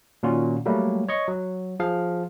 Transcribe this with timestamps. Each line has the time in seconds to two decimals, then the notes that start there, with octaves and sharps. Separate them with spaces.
0.23 A#2 D#3 C#4 F4 F#4
0.66 F#3 G3 A3 A#3
1.09 C#5 D#5 C#6
1.28 F#3
1.80 F3 G#4 F5